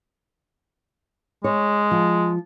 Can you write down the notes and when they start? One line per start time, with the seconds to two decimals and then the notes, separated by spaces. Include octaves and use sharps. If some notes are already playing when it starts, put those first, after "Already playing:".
1.44 G#3 C#5
1.91 F3